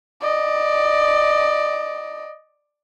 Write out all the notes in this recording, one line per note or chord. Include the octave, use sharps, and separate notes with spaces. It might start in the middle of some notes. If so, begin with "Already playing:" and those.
D5 D#5